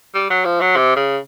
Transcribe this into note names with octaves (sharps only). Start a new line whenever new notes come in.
G3
F#3
F3
F#3
C3
C#3